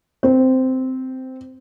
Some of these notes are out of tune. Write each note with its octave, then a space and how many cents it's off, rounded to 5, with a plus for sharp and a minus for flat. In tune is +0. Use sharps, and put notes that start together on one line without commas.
C4 -10